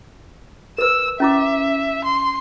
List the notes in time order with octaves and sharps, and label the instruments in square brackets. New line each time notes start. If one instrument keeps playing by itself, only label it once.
[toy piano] A#4 B4 [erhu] E6
[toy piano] C#4 E4 D6 [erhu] E5
[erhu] C6